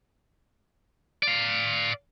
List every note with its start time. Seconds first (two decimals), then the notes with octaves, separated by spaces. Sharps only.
1.23 D5 F5